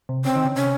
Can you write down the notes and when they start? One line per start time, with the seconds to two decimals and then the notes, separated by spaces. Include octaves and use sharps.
0.09 C3
0.25 C#3 C4
0.35 D#3
0.45 C#3
0.56 C3 C#4